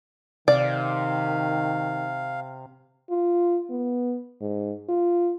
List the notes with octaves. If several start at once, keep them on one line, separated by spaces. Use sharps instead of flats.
C3 D#3 D5 F5
F4
B3
G#2
F4